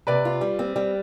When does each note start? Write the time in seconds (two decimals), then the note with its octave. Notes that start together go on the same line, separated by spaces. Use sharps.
0.07 C3 B4 D5
0.25 F4
0.41 G3
0.59 C4
0.76 G3